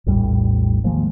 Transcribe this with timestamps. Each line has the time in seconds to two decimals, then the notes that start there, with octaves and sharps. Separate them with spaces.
0.07 A#1 E2 A2 G3
0.84 D#3 F3 G#3 A#3